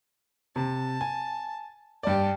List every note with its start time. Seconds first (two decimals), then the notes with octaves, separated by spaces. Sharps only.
0.56 C3 A5
1.01 G#5
2.03 G2 G4 D5 A5